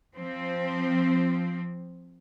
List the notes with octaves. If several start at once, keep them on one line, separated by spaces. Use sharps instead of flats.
F3 C4